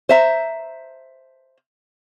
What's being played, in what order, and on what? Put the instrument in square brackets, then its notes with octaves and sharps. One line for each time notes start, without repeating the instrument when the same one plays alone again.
[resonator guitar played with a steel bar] C5 E5 A#5